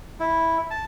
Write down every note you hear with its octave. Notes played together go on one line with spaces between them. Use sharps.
E4
A5